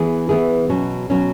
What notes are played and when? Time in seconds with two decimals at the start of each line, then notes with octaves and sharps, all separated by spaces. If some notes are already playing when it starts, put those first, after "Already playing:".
Already playing: E3 B3 E4 G#4
0.29 E3 B3 E4 G#4
0.69 B2 F#3 C#4
1.10 B2 F#3 C#4